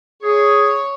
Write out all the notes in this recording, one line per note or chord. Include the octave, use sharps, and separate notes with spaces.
G#4 C#5